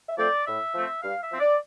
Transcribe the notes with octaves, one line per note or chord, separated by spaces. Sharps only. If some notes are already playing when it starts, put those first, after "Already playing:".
E5
F3 A3 C4 D5
A2 E5
F3 A3 C4
G2 F5
E5
F3 C4
D5